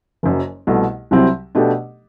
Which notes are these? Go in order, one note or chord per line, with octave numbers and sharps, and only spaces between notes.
F#1 F#2 F#3
C2 B2 A3
C2 C3 F#3 C4 E4
B2 A3 D4 G4